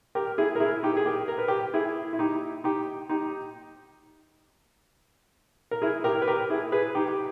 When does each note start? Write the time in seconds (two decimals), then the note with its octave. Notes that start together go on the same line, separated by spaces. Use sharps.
0.15 G4 A#4
0.38 E4 G#4
0.55 A#4
0.60 E4 G#4
0.83 D#4 G4
0.97 G#4
1.06 G4 A#4
1.28 A#4
1.38 B4
1.48 G4 A#4
1.74 E4 G#4
2.13 E4
2.19 D#4 G4
2.64 D#4 G4
3.09 D#4 G4
5.71 A#4
5.82 E4 G#4
6.04 G4 A#4
6.22 B4
6.27 G4 A#4
6.50 E4 G#4
6.72 G#4 B4
6.95 D#4 G4
7.08 G4